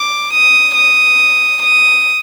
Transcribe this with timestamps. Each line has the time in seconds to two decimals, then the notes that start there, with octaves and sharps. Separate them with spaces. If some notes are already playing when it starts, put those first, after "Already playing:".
Already playing: D6
0.32 D#6
0.75 D#6
1.62 D#6